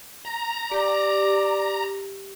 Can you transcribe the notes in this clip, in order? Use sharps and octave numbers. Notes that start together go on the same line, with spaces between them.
A#5
G4 D5